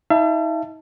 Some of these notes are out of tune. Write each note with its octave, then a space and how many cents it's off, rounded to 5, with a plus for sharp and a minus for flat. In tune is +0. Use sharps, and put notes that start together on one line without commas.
D#4 +40 E5 +45 A5 +0